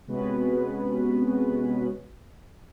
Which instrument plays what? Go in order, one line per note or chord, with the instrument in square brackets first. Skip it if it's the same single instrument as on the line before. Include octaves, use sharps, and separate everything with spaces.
[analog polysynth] C3 G#3 B3 C#4 F#4 B4